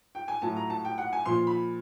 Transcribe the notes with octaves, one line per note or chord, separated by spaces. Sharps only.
G5
G#5
A2 F#3 A5
A#5
A5
G5
F#5
G#5
A#2 F3 C6
B5